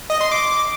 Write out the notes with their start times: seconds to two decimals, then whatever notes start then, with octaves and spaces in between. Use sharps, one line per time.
0.10 D#5
0.21 C6
0.32 D6